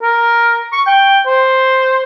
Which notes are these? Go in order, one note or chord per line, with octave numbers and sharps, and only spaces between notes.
A#4
C#6
G5
C5